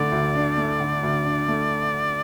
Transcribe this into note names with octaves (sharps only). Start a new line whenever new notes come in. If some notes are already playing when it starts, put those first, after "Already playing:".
Already playing: D2 D3 A3 D5
D2
D4
A3
D3
D2
D4
A3